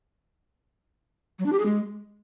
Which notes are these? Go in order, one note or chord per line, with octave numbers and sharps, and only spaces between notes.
F#3
D4
G4
G#4
G#3